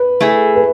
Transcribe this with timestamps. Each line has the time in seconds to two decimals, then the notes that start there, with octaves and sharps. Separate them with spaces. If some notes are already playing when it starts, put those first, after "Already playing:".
Already playing: B4
0.21 A3 E4 G#4
0.55 B4